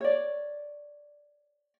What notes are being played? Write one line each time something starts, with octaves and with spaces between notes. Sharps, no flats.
C#5 D5